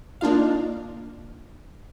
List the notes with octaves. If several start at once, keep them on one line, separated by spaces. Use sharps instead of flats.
A#3 D4 D#4 F4 F5